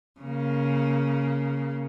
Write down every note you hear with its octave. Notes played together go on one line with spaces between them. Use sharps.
C#3 A#3